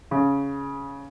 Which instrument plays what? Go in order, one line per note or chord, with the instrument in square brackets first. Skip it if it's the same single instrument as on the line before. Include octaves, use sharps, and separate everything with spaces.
[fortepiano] C#3